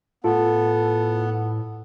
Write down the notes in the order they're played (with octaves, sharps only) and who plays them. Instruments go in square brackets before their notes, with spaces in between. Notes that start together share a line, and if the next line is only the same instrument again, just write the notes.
[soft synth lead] A2 [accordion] B3 [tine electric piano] F4 [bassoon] A4